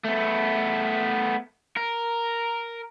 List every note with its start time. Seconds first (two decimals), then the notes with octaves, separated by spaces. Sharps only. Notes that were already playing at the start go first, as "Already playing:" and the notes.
0.04 A3 B3
1.77 A#4